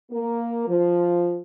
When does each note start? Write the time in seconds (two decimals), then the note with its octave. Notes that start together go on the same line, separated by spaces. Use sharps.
0.12 A#3
0.68 F3